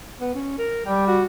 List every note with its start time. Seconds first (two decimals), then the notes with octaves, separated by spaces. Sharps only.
0.21 B3
0.35 C#4
0.58 A#4
0.86 G3 G5
1.07 F#4